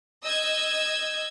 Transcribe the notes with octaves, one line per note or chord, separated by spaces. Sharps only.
D#5 E6 G6 G#6